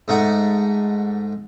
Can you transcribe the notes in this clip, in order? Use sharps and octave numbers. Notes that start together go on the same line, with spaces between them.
G#2 A3 D#4 F#5